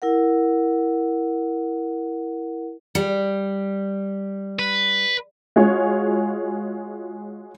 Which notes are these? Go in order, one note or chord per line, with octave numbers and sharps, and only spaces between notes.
E4 A#4 F#5
G3
B4
G#3 F4 F#4 G#4 C#5